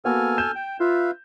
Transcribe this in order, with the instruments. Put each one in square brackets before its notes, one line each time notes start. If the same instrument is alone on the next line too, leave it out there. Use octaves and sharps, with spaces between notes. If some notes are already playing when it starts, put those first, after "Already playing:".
[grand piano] A#3 B3 F#4 [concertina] A4 G#5 F6
[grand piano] G6 E7
[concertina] G5
[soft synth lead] F4 [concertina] B4 E5 F5